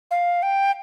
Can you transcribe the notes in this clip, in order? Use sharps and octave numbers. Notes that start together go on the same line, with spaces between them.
F5
G5